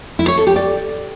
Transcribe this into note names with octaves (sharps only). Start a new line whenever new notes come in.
E4
C#5
A4
G4
D5